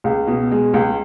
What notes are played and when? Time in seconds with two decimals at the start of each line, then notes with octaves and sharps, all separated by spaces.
0.04 C#2
0.27 B2
0.51 G#3
0.74 C#2